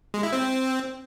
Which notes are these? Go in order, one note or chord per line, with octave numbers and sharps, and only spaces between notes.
G#3
E4
C4